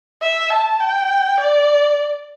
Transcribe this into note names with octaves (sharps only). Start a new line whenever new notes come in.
E5
A5
G5
D5